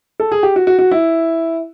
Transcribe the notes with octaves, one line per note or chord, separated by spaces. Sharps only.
A4
G#4
G4
F#4
F#4
F#4
E4